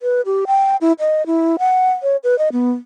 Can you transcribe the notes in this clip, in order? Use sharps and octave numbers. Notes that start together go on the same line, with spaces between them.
B4
G4
G5
E4
D#5
E4
F#5
C#5
B4
D#5
B3